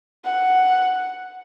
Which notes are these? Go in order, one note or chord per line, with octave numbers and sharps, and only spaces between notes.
F#5